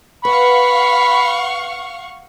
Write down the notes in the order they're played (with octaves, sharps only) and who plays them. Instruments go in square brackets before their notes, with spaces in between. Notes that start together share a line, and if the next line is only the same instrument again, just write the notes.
[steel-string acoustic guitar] B4 [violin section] F5 F#5 C#6 [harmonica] B5